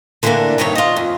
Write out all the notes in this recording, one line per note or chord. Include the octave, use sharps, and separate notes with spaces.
D3 E3 G3 A3 A#3 D4
G2 C3 D#3 A3 D#4 C#5
F4 D#5
F2